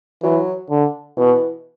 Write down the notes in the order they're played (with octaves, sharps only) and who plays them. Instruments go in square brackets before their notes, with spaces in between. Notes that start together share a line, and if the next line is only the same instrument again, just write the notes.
[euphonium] E3 [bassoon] F#3
[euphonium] D3
[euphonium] B2 [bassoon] E3